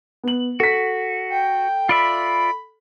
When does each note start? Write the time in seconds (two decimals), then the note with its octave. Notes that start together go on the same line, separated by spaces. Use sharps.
0.23 B3 F#7
0.60 F#4 A4 B6
1.30 G5
1.89 F4 D5 E5 B5